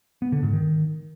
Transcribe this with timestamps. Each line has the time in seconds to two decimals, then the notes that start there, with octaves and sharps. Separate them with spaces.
0.22 B3
0.32 D3
0.43 G#2
0.53 D#3